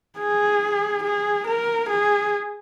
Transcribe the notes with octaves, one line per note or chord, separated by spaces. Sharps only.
G#4
G#4
A#4
G#4